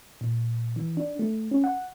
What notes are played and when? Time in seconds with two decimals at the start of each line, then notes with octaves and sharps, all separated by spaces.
0.21 A#2
0.76 E3
0.97 D4
1.19 A3
1.51 C#4
1.64 F#5